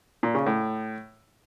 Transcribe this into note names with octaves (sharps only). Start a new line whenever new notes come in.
A#2
C#3
A2